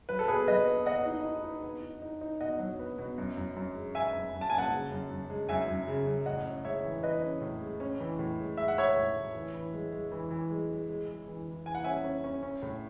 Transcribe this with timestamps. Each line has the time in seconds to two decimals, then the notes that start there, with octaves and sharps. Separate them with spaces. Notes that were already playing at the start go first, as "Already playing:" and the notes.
0.09 F#3 B4
0.19 A4
0.28 B2 G#4 B4
0.48 F#3 B4 D#5
0.67 B3
0.86 B3 D#5 F#5
1.05 D#4
1.25 D#4
1.44 D#4
1.63 B3
1.82 D#4
2.02 D#4
2.21 D#4
2.41 B2 D#5 F#5
2.59 F#3
2.79 B3
2.98 B2
3.18 F#2
3.37 F#2
3.56 F#2
3.75 G#3
3.95 G#3 E5 G#5
4.14 F#2
4.33 F#2
4.41 A5
4.50 F#2 G#5
4.58 F#5 A5
4.72 C#3
4.91 F#2
5.10 F#2
5.30 G#3
5.49 F#2 E5 G#5
5.68 F#2
5.88 C#3
6.07 F#2
6.26 A2 D#5 F#5
6.45 C#4
6.65 G#3 C#5 E5
6.84 E3
7.03 E3 B4 D#5
7.22 C#4
7.42 A2
7.61 G#3
7.80 C#4
8.00 E3
8.19 A2
8.38 G#3
8.57 G#3 E5
8.68 F#5
8.77 G#3 C#5 E5
8.96 A2
9.16 A2
9.34 E3
9.54 E3
9.73 G#3
9.92 G#3
10.12 E3
10.30 E3
10.51 G#3
10.70 G#3
10.89 G#3
11.08 G#3
11.28 E3
11.47 E3
11.66 E3 G#5
11.75 F#5
11.84 C#4 E5 G#5
12.04 C#4
12.24 C#4
12.43 C#4
12.63 A2